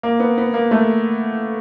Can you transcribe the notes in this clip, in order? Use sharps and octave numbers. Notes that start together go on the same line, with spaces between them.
A#3
B3
B3
A#3
A3